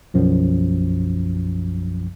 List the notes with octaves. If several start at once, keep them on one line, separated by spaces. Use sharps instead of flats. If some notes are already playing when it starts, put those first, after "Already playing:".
B1 F#2 F3